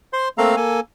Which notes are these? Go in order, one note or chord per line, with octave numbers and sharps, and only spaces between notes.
C5 C6
A3 A#3 C4 A4 F5 A#5
A#3 A4 G#5